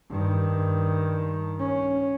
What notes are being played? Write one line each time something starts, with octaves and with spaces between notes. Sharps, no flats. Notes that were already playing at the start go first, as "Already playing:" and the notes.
G2 D#3
C#4